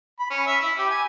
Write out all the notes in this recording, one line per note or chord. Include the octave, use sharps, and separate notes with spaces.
B5
C#4
E5
E4
G4
G#5